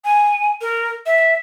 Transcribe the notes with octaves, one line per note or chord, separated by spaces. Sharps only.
G#5
A#4
E5